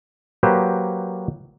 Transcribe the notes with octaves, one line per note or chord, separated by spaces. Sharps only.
F#3 A#3 G4 B4 C5